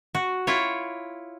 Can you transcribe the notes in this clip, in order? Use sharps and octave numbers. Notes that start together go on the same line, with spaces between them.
F#4
E4 F4 C#5